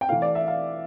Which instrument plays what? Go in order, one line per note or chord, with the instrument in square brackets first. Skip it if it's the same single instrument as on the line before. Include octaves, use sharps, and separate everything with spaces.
[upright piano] G5
E3 A3 E4 F5
D5
E5
F5